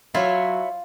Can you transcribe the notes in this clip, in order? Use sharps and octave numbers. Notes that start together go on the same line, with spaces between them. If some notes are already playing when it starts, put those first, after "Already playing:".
F#3 E4 F4 C#5 E5